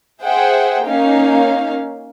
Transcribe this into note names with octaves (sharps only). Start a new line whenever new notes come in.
G#4 C5 E5 F#5 G5
A#3 C#4 D#4 F5